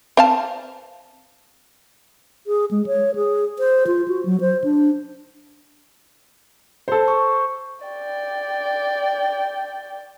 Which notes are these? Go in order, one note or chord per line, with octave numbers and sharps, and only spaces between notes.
C4 F5 A5
G#4
G#3
C#5
G#4
C5
F4
F#4
F#3
C5
D4
A4 C5
C#6
D5 G5